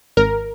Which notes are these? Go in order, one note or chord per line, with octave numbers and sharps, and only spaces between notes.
G#1 A#4